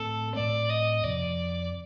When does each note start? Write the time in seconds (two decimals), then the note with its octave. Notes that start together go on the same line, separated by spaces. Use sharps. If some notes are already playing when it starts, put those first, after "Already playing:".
Already playing: A2 A3 C4 A4
0.35 A2 A3 C4 D5
0.69 D#5
1.03 F2 C3 F3 D5